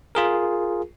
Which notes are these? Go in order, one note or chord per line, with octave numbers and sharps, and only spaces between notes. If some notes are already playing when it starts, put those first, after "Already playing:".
F4 G#4 A#4